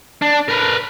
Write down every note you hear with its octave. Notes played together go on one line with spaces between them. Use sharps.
D4
A#4 B4